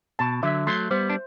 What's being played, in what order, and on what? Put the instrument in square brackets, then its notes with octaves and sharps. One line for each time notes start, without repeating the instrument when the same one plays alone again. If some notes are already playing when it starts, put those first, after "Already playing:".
[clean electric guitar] B2 [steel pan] A5
[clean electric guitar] D3 F#3 [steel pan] E5
[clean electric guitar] F#3 A3 [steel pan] C6
[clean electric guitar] G3 B3 [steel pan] C5
[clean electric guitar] D4